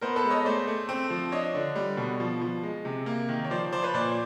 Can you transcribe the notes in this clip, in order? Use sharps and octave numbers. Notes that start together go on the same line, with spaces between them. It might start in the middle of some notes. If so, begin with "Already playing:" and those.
B3 A#4 C5
A4 B4
G#3
C#5 D#5
A3 C5 D5
A3
C4
F3
D4 C#5 D#5
D3
G3
B2
F3
F3
G#3
C3
A#3
D#3
C#5
F3 C5 D5
F3 C5 D5
B4 C#5
A#2 C5 D5